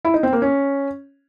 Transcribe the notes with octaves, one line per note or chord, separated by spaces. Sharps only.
E4
D#4
C4
A#3
C#4